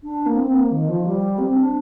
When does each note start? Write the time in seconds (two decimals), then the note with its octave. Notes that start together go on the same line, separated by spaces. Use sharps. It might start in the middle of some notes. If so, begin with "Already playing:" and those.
0.03 D4
0.26 A#3
0.37 C4
0.54 A#3
0.71 D#3
0.88 F3
1.06 G3
1.38 C4
1.56 D4